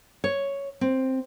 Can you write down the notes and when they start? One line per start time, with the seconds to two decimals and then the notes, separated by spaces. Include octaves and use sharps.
0.24 C#5
0.81 C4